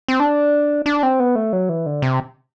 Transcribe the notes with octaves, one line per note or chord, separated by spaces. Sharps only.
C4
D4
D4
C4
B3
A3
F#3
E3
D3
C3